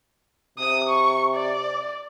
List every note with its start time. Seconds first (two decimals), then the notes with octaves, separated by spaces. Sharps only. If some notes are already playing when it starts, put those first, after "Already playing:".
0.58 C3 D#6
0.89 C#6
1.35 D5